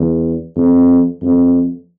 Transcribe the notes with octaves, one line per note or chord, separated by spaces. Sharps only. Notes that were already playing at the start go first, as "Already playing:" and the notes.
Already playing: E2
F2
F2